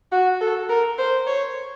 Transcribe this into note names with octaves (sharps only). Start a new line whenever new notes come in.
F#4
A4
A#4
C5
C#5